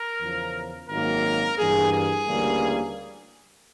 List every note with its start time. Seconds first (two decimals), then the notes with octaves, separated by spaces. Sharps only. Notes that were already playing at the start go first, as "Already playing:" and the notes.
Already playing: A#4
0.20 E2 C#3 F3
0.89 G#1 F#2 D#3 F#3 A#3 A#4
1.57 G2 E3 G3 A#3 G#4
1.92 G#4
2.26 D2 C#3 E3 G3 A#3